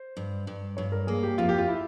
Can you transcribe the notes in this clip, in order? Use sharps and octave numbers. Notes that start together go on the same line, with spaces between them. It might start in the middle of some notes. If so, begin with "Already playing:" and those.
Already playing: C5
G2
G2
G2 C#5
A#4
A#3 G#4
G4
F2 F4
G4
F4
E4